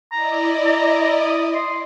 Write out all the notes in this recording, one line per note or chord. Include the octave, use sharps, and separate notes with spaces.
E4 D5 D#5 A#5
A#5
D#6
C6